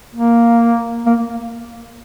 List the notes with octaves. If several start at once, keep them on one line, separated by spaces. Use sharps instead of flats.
A#3
A#3